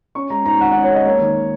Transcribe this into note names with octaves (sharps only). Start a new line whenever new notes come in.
C#4 C#6
G#3 A#5
G#2 A#5
G#1 F#5
C#4 F#5
C#5
G#3 D#5
A#3 C#5
D#3